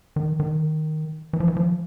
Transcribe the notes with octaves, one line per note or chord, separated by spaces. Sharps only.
D#3
D#3
E3
F3
E3
F3